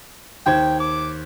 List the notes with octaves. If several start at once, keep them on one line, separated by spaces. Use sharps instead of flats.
D#2 C5 G5 G#6
D6